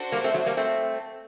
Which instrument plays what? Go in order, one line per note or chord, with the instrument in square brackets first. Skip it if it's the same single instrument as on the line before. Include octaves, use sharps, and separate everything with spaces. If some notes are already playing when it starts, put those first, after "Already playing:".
Already playing: [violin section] D4 F#4 A4 C5
[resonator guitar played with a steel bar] G3 A#3
A3 C4
F#3 A3
G3 A#3
A3 C4